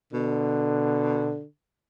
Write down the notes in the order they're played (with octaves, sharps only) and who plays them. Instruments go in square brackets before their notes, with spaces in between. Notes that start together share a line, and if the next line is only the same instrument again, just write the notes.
[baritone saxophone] B2 [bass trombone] D3